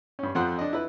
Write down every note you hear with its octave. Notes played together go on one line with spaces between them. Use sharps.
G2 C#4
F2 F3 F#5 C6
D4 D#5
E4 B4